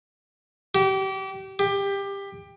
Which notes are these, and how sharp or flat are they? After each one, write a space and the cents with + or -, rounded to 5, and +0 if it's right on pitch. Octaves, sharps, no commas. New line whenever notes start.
G4 -30
G4 +20